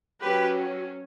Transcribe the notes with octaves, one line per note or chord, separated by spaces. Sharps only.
F#3 C#4 G4 B4